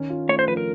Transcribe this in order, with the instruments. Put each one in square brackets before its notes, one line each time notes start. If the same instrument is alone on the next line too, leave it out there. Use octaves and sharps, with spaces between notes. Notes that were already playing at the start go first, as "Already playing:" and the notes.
Already playing: [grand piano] D#3 C#4
F4
[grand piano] A3 [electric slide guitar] C#5
[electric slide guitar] C5
[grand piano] F3 [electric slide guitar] B4
[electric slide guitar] A#4